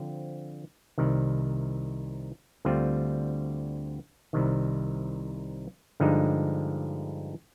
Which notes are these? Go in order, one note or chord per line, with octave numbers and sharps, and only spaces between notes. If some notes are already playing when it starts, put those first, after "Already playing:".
Already playing: D3 F3 C4
C2 C3 D#3
D2 D3 G3 C4 F4
C2 C3 D#3
G2 D3 F3 G#3 D#4